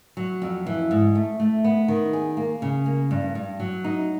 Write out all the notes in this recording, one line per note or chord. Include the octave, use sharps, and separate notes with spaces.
F#3
F2
E3
G#2
A3
A3
B3
D#3
G#4
A#3
C#3
A#3
G2
G2
F#3
D#4